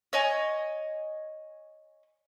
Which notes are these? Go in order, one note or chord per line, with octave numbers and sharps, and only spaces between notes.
C#5 D#5 G#5